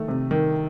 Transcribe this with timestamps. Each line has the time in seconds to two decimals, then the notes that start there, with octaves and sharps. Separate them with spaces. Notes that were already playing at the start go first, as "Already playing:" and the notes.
Already playing: D#3 A3
0.08 C3
0.31 D#3